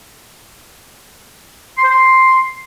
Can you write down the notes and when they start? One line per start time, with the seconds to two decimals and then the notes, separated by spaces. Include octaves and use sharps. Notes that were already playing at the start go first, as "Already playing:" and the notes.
1.78 C6
1.84 C5
1.90 C6